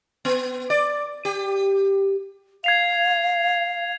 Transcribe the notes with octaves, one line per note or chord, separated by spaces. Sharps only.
B3
D5
G4
F5 G#6 C7 F7